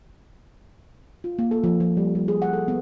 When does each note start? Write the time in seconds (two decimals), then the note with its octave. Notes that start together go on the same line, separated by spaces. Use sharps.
1.24 F4
1.39 A#3
1.51 A4
1.64 F3
1.80 F3
1.97 G3
2.15 G3
2.28 G#4
2.42 F#5
2.53 A4
2.68 B3